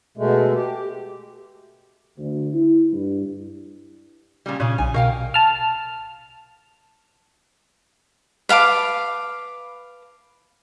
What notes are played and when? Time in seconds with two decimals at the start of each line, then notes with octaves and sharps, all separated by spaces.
0.17 B2 G#3 A3
0.54 G4
2.18 D2
2.53 E4
2.93 G2
4.46 A#2 C#3 G3
4.60 A#2 C#3 C#4
4.78 B1 G#5
4.94 B2 A#4 F5 G5
5.34 A5 F6
8.49 B4 F5 A5 D6